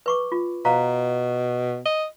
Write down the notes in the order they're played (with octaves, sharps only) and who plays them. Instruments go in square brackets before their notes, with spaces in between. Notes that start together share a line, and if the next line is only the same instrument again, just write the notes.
[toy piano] B4 C#6 D6
F4
[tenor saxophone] B2 [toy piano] C5 F5 A#5
[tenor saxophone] D#5